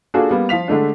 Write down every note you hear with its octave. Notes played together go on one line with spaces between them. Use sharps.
A#3 D4 F4 F#4 G#4 A4
G3 A#3 B3
F3 F4 F5 B6 F7
D3 G#3 A3 D4